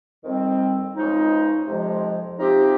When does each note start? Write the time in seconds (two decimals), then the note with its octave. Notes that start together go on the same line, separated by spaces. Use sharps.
0.23 F2 D#3 G3 C4
0.95 C#2 C#3 F3 G#3 D#4
1.67 F2 C3 F3 G#3
2.39 C3 F3 C4 D#4 G4